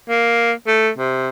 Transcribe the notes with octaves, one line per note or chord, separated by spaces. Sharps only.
A#3
A3
C3